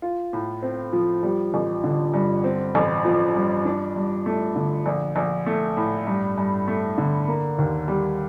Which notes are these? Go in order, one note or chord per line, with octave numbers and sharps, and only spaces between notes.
F4
A2
C4
F3
G3
A1
D3
G2
C4
A1
F3
G2
D4
G2
A3
D3
A#1
A#1
A3
A2
G2
G2
A3
D3
A#3
D#2
G3